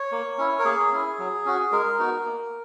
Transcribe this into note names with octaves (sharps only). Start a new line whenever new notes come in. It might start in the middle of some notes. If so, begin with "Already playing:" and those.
Already playing: C#5
A#3
C#4 E4
A#4
A#3 G#4
C#4 E4
F#3
C#4 F#4
G#3 A#4
B3 D#4 F#4
A#3